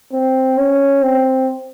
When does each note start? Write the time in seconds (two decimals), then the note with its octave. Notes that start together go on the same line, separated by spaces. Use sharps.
0.13 C4
0.57 C#4
1.02 C4